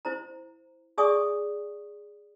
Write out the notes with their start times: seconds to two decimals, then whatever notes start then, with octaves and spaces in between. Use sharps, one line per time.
0.05 E4 C5 A#5
0.98 G#4 D5 E5 G#5 C#6 D#6